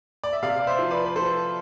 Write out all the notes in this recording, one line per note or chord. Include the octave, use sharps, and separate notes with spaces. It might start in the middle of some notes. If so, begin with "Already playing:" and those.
D5
E5
C3 D5 F5
D5
C5 E5
F3
B4 D5
B4
F3 A4 C5